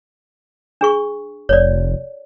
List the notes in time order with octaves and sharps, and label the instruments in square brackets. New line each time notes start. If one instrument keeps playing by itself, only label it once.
[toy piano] D4 G#4 C#6
[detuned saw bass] F1 [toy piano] C#5 D5